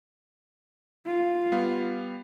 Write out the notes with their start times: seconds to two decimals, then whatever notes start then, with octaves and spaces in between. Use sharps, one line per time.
1.07 F4
1.52 G3 B3 F5